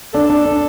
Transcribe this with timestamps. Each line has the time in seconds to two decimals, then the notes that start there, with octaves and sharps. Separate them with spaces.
0.14 D4 A4
0.30 D4
0.45 D4